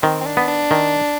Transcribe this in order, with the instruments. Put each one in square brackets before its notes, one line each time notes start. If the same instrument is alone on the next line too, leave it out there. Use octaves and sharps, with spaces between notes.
[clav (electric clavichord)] D#3 [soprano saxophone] C4
[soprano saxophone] C4
D4
[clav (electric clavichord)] B3
[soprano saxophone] D4
[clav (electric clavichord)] D#3